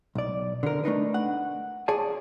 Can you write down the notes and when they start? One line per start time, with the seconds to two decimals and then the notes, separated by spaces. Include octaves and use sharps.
0.15 B1 D5
0.63 D3 A#4
0.84 A3 D4 D#4 B4
1.14 F#5
1.88 G#4 C#5 D5 G#5 A5